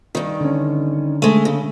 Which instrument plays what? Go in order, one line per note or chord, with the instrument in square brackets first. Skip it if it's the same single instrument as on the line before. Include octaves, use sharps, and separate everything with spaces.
[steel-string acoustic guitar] G2 D#3
[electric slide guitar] D3 C#4
[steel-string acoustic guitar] G#3 A3
C#3